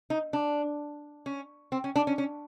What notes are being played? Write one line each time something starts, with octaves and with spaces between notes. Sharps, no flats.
D#4
D4
C#4
C4
C#4
D4
C#4
C#4